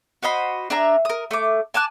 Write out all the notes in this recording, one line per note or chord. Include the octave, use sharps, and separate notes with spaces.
F#4 C5 D#5 B5
D4 G#4 E5 A#5
A#4 D#6
A3 D6
G#5 A5 D6 F#6